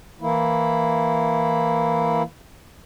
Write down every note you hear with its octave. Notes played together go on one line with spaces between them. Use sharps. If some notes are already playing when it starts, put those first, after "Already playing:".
E3 A#3 E4